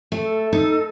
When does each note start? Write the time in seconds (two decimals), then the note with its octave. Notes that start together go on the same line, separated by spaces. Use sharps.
0.12 A3
0.23 A4
0.53 D#4